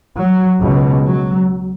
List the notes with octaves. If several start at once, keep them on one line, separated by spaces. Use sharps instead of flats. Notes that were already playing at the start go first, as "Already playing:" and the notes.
F#3
C#2 B2
F#3